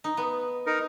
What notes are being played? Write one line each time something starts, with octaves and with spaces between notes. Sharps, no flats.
D#4
B3
D#4 A#4